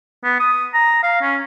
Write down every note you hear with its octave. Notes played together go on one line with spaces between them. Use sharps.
B3
D#6
A#5
F5
C#4